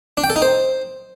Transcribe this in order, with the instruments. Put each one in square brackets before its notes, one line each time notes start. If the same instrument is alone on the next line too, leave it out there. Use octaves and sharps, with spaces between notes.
[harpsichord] D4
G5
A4
D#4
C5